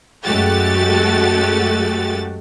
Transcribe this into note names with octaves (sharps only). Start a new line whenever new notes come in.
F#2 G#3 A3 F#4 G4 A6